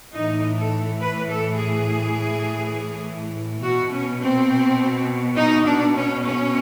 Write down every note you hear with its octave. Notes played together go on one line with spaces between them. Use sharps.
A2 E3 D#4
A4
B4
A4
G#4
B2 F#4
C#4
C4
D#4
D4
C#4
C#4